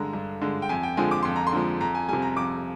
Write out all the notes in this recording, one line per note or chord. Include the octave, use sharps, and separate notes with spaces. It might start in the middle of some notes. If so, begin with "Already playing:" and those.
Already playing: G2 D3 G#3 A#5
G2
D3 G#3
G5
F2 G#5
G5
D3 F3 G#3 G#5
D6
F2 C6
A#5
C6
D3 F3 G#3
F2 A#5
G#5
C3 G3 G#5
A#5
F2 D6